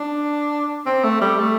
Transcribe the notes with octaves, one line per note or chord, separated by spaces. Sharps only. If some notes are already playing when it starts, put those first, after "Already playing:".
Already playing: D4
C4
A3
G3
A3